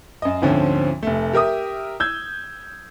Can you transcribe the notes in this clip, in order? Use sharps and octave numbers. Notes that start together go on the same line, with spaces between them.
F#2 D#5
D2 G#2 D3 F3 C4 C#4
F1 A3
G4 A#4 E5 D#6
E6 G6 G#6